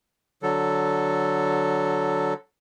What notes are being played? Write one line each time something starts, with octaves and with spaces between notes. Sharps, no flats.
D3 F#3 A4